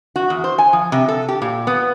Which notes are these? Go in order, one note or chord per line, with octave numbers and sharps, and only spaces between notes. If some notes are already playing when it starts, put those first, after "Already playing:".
F#4
E2
C5
G#5
F3
C3
A4
G4
A#2
B3